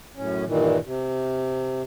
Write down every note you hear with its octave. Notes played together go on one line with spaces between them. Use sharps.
F#2 A2 C#4
G2 A#2 D#3 E3
C3